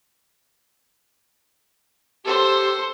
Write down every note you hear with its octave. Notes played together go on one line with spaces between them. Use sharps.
G4 A4 C5